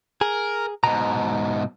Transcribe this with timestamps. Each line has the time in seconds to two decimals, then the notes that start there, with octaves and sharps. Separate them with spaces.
0.21 G#4 A#4
0.84 G#2 B2 A#5